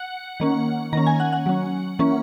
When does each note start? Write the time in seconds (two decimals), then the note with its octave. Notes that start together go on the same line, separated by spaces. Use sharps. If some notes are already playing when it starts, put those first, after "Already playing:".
Already playing: F#5
0.40 D#3 A#3 C#4
0.93 D#3 A#3 C#4 A#5
1.07 G#5
1.20 F#5
1.33 F#5
1.46 F#3 C#4
1.99 E3 A#3 C#4